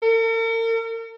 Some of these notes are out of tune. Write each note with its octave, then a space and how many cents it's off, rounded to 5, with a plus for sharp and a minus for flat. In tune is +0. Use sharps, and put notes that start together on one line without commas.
A#4 -45